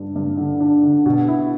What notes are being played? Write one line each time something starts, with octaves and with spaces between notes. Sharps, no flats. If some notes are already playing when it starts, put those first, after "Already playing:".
Already playing: G2 D4
G2
D3
D4
D3
B2
E4